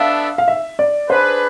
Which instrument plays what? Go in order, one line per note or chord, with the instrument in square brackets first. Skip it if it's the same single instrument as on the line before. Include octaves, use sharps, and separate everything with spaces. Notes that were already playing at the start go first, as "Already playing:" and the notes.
Already playing: [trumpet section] B3 D4 A4 E5 [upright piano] F5
[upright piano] F5
E5
D5
[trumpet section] D4 G#4 B4 [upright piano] C5